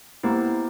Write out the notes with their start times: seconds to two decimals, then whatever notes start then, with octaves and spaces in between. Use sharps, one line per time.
0.23 A#3 B3 E4 G4 C5